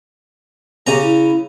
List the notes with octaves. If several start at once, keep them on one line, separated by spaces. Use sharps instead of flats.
C#3 C#4 G4 A#5
E4